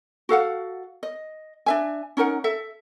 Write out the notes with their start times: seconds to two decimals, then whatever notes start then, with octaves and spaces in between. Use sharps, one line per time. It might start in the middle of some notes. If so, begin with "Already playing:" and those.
0.29 F#4 A4 F5 F#5
1.03 D#5
1.66 D4 E5 G#5
2.17 C#4 D#4 A#4 F#5
2.44 A4 E5